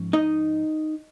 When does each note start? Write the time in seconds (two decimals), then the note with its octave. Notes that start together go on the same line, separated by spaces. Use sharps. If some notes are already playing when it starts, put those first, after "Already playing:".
Already playing: G#2 F3 C#4
0.13 D#4 D#5